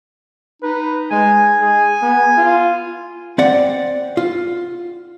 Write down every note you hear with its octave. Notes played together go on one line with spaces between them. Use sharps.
D#4 B4
G#3 G#5
G#4
B3
F4
C4 D5 F#5
F4